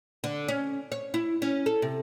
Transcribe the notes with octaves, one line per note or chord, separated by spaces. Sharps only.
D3
C#4
C#5
E4
C#4
A4
C3